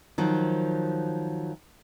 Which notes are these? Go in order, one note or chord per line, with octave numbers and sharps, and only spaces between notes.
D#3 F3 F#3